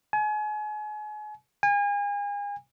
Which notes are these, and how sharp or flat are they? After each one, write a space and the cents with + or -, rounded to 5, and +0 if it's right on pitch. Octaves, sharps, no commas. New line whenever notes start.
G#5 +35
G#5 -35